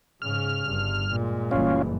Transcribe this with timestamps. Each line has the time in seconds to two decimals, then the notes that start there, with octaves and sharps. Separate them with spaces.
0.22 G#2 C#3 F6
0.65 G1 G2
1.11 A#2 G#3
1.51 F#1 E3 G3 C#4 F4